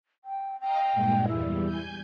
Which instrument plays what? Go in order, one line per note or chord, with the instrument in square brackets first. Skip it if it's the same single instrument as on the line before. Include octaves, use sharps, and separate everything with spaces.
[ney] G5
[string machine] D#5 F5 A#5 [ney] G5
[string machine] G2 A#2 G#3
[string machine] E2 G3 [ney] E4
[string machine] G#5 G6